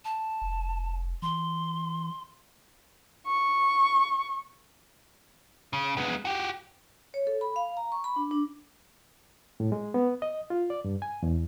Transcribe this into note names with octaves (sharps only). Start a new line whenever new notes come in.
A5
F1
E3 C6
C#6
C#3
G#3 B3
F#4 G4
C#5
A4
B5
F5
A#5
C#6
B5
D4
D4
A2
G#3
B3
D#5
F4
D5
G2
G#5
E2